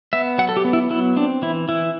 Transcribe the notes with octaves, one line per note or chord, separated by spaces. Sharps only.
B3 E5
F#3 F#5
A4
G4
B3
E4
F#3 E4
C4 D4
E3 E4
E3 E4